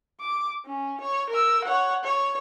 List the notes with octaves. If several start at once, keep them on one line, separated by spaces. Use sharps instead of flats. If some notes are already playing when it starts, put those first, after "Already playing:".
D6
C#4
C#5
A#4 E6
C#5 F#5
C#5